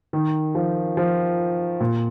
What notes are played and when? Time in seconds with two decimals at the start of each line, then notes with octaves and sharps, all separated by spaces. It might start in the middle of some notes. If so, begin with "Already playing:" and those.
0.13 D#3
0.55 F3
0.97 F3
1.81 A#2